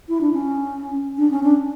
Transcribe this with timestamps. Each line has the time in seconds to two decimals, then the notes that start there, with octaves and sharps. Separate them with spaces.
0.09 E4
0.21 D4
0.33 C#4
1.18 D4
1.31 C#4
1.43 D4